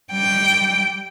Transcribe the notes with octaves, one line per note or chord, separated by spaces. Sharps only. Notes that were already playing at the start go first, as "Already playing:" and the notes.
G3 G5